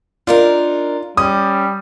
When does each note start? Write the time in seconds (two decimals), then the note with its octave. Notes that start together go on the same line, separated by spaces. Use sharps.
0.27 D4 D#4 F4 A#4
1.17 G3 C#4 D#6